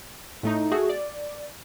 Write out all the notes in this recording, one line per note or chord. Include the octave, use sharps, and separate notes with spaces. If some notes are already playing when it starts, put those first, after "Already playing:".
A2 A3 D#4
A3 F#4 G#4
D5